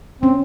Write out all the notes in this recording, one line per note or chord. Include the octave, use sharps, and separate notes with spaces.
C4 C#4